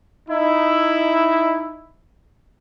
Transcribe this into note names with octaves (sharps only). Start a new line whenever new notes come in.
D#4 E4